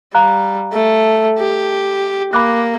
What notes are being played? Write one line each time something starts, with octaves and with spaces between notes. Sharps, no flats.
G3 F5 A#5 F#6
A3
G4
A#3 B5 D6 F#6